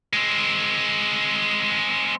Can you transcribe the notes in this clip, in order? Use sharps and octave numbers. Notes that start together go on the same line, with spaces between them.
G#3 C4